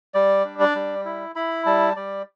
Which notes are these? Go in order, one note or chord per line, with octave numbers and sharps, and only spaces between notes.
G3 D5
D4
D5
G3
E4
E4 B5
G3 A5
G3 D5